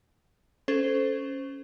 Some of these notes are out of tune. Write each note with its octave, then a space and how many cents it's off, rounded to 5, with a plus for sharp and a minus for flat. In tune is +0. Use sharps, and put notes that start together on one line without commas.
C#4 +0 A4 +0 C5 -10